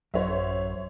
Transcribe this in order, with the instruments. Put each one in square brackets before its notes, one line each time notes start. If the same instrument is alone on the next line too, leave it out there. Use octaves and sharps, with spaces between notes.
[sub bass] A1 [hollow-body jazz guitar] F#2 [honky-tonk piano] C5 C#5 E5